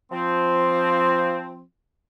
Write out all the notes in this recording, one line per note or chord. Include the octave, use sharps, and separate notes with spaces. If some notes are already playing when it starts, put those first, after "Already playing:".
F3 C4